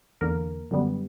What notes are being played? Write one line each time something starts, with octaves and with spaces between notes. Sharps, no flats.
E2 D3 A#3 A#4
F#2 D3 G3 B3